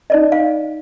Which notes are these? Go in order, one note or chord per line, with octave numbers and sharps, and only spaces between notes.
D#4 D5 D#5
F5